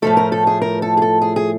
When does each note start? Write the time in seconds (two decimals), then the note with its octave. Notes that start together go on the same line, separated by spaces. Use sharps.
0.02 A2 F3 A3 A4
0.17 A#4
0.32 A4
0.47 G#4
0.62 A#4
0.82 A4
0.97 G#4
1.02 A4
1.22 G#4
1.36 G#4